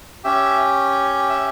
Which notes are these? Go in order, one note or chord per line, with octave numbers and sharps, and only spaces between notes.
C#4 G4 E5
E5